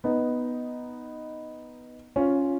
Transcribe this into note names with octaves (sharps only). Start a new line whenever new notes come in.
B3 D#4
C#4 F4